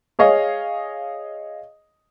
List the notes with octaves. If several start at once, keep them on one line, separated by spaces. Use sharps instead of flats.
G#4 C#5 D#5 F5